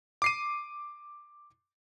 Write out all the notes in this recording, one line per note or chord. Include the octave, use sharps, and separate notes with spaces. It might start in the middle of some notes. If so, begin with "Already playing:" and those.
D6 C7 D#7